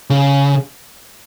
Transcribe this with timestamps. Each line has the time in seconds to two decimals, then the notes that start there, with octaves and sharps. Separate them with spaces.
0.10 C#3